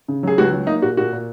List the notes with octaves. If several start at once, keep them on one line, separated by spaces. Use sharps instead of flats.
C#3
F#3 G#4
C#2 F#4
F#3
A#3 D#4
A#2 F#4
A#2 F#4
A#2